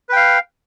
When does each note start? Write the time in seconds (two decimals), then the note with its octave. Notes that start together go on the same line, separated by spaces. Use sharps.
0.09 B4
0.13 G5
0.16 F5